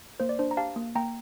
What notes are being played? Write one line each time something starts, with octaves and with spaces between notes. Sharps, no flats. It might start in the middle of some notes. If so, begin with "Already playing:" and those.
A#3 C5
D5
D4 C5
A#5
G4 F5 A5
A#3
A#3 G5 A#5